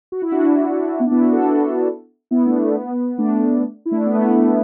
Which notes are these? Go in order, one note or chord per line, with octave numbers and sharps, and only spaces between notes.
F#4
E4
D4 F#4
F#4
B3 E4
D4
B3 E4
D4 F#4
E4 A4
D4 F#4
B3 E4
A3 D4
A3
B3
A3 D4
E4
A3 D4
B3
A3
B3
A3